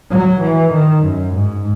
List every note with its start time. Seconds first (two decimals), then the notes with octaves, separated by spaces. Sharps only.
0.11 F#3
0.41 E3
0.73 D#3
1.04 F#2
1.34 G#2